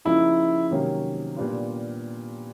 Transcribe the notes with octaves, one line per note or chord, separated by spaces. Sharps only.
C#3 F3 A#3 D#4 E4
C3 D#3 F#3 A#3 C#4
A#2 G3 B3 D4 F4